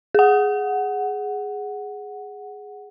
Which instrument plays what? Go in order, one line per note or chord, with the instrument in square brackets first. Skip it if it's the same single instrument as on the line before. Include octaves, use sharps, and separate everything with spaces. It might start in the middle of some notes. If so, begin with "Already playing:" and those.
[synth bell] G#4 F#5